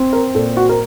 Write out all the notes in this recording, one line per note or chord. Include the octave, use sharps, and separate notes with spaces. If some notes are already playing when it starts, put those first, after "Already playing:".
Already playing: C4
A#4
A#2 A4
F#4
A#4